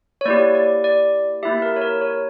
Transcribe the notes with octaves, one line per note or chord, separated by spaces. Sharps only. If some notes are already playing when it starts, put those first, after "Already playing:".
C#5
A#3 E4 G4 D5
D5
D5
A#3 E4 G4 E5
A#4
C#5
A#4
C#5